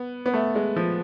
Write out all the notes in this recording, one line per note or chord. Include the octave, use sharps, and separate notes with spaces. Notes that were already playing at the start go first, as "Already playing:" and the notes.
Already playing: B3
B3
A3
G#3
F3